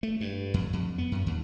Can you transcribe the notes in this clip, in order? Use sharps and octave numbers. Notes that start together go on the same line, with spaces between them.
A3
G2
F2
F2
B3
F#2
D#2